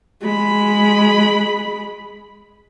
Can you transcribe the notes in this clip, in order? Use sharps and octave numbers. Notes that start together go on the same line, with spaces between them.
G#3 B5